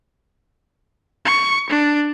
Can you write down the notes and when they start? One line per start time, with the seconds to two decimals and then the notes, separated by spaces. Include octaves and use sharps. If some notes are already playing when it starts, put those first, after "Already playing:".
1.25 C#6
1.70 D4